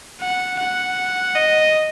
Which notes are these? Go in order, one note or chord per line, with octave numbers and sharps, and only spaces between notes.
F#5
F#5
D#5